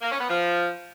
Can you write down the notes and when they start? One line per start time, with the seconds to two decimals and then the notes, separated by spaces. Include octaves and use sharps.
0.01 A#3
0.11 C#4
0.20 B3
0.29 F3